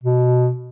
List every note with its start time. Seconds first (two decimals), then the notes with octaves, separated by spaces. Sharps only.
0.04 B2